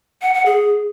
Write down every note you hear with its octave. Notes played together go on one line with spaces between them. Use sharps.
F#5
F#5
G#4